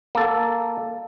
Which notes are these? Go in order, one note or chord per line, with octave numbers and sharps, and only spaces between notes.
A#3 A4